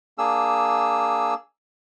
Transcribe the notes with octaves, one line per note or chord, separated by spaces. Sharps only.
A#3 D4 G#4 E6